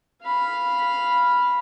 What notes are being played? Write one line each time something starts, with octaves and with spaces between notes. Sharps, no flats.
F5 B5